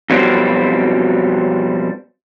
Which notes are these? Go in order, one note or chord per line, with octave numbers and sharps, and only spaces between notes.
F2 B2 F#3 G3 C4